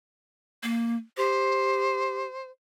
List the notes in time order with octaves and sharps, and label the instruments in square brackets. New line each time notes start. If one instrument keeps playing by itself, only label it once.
[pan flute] A#3
[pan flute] G4 [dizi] C5